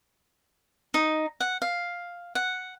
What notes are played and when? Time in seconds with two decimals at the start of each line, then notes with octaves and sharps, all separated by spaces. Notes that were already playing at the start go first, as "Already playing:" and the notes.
0.94 D#4
1.40 F#5
1.62 F5
2.35 F#5